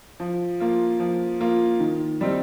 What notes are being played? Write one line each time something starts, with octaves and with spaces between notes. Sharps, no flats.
F3
A#3 F4
F3
A#3 F4
D#3
G3 C4 D#4